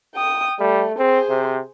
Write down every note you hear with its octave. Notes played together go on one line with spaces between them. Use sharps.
G5 D#6
G3 A3
C4 G#4 C5
C3